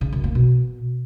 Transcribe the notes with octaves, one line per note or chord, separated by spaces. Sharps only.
C#3
F#2
A#3
B2